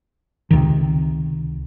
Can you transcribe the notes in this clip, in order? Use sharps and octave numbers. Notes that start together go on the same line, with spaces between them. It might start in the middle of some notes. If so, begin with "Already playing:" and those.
C#2 C3 D#3